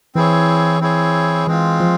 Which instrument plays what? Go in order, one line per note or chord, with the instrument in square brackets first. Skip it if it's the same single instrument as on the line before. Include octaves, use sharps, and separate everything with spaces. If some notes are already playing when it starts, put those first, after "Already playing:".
[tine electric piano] E3 [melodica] C4 E4 G#4 C#5
[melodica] C4 E4 G#4 C#5
[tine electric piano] E3 [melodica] G#3 C4 F4
[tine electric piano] F3